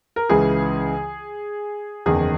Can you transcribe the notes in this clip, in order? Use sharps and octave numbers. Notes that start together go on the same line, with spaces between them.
A#4
C#2 C#3 E3 G#4
F#1 E2 D#3 G#4